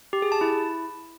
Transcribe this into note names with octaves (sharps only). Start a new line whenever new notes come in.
G4
G#4
A5
E4